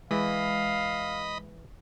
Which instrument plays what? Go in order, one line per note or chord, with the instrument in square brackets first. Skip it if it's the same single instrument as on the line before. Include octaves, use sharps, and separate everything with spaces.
[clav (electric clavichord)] E3 [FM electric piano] G#3 [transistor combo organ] D#5 B5 [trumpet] F5